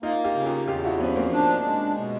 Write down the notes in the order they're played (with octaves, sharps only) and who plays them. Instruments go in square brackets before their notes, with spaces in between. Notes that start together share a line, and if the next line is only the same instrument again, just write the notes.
[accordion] A#3 [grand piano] D#4 F4
[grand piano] F4 G4
[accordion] C#3
[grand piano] F4 G4
[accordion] E2 [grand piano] F4 G4
[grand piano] E4 F#4
[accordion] F3 [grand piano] B3 C#4
[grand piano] A#3 C4
[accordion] D4
G#3
B2